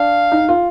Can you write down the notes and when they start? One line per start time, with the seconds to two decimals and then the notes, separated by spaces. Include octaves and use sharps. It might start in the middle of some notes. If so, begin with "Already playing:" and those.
Already playing: D4 F5
0.32 D#4
0.49 F4